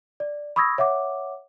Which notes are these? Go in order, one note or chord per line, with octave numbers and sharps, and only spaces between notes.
D5
B5 C#6 D#6 E6 G#6 A#6
C#5 E5 F#5 D6